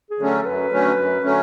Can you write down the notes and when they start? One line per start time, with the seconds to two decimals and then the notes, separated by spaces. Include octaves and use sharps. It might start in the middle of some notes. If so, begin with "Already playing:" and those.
0.11 G#4
0.19 D3 F#3 A3 C#4
0.28 A4
0.46 F#2 B4
0.72 D3 F#3 A3 C#4
0.97 F#2
1.24 D3 F#3 A3 C#4